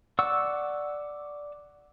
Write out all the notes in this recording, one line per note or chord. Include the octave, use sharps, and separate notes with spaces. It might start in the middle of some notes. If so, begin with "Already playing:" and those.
D5 F#5 C#6 E6